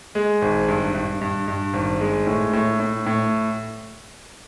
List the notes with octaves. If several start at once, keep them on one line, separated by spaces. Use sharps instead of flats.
G#3
G#1
G2
G2
G2
G2
G#1
G#3
A2
A2
A2
A2